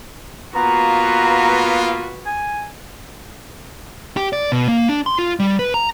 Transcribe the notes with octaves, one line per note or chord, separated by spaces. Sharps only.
A#3 B3 F4 F#4 B4 A#5
G#5
G4
D5
B2
A#3
D4
C6
F4
G3
B4
A#5